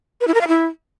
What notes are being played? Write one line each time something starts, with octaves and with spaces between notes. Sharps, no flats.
B4
E4
A#4
F5
E4